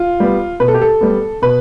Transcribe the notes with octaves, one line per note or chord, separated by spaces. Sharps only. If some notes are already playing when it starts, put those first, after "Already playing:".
Already playing: F4
G3 B3
B2 B4
A4
G4
A4
G3 B3
B2 B4